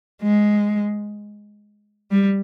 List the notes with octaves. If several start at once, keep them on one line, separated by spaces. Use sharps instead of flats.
G#3
G3